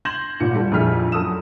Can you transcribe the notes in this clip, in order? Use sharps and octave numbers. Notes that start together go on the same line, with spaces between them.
C6 G6 G#6 A#6 E7 F#7
G#1 A#2 C#7
G3 A4
A#1 F2 E4 G#4 F6 B6
F#2 A4 D#6 E6 E7